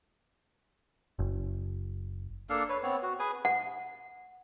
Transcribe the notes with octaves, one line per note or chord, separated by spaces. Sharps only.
F#1
A#3 D4 A4 F5
B4 C#5
B3 C4 C#5
F#4
G#4 B4 G#5
F#5